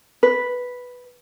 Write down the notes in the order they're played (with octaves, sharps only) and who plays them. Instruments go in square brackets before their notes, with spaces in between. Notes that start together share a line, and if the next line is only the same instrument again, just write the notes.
[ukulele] B4